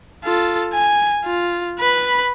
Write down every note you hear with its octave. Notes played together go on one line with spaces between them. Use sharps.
F4 A4
G#5
F4
B4 B5